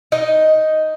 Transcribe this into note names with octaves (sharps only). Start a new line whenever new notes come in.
D#4 D#5